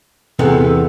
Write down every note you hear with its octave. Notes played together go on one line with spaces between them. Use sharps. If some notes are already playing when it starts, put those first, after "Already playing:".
E2 C3 B3 A4